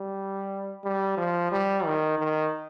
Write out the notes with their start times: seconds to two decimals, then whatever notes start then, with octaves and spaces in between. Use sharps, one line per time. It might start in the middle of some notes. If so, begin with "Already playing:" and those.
Already playing: G3
0.84 G3
1.17 F3
1.52 G3
1.85 D#3
2.18 D#3